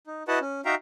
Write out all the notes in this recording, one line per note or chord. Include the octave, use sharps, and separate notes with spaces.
D#4
E4 F#4 B4 D#5 F#5 A5
C#4
D#4 F#4 E5 F5 G5 A#5